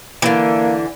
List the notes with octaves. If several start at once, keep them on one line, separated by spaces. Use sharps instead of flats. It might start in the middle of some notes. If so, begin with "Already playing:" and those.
D3 E3 A#3